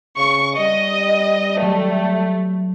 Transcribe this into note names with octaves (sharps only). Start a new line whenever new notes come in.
C#3 C#6
G3 D#5
F#3 A3